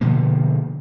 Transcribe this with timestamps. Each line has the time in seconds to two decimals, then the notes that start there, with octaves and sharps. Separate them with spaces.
0.01 B2 D3 F3 A#3